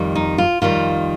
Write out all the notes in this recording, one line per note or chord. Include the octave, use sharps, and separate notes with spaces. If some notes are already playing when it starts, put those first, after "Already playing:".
Already playing: F2 D#3 G3
D#4
F4
F2 D#3 G3 F4